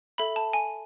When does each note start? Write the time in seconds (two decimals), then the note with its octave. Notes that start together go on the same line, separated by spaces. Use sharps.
0.18 A4 E5 B5
0.36 A5
0.53 G#5